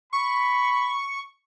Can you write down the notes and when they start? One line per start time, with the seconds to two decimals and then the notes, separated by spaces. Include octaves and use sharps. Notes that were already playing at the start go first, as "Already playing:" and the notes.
0.13 B5 C#6